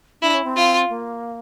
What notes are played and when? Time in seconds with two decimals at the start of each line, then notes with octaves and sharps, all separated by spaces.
0.22 D4 E4
0.34 C#4
0.44 C4
0.56 F4
0.90 A#3